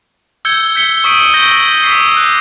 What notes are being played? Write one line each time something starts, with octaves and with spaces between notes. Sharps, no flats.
E6 G6 G#6 C#7 G7
G6 B6 C#7 G7
C#6 D#6 B6 D7 D#7
E6 G6 A#6
D6 B6 C7
F#6